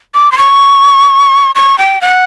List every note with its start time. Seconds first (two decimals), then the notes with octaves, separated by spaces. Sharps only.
0.14 D6
0.32 C6
0.38 C#6
1.55 C#6
1.78 G5
2.01 F#5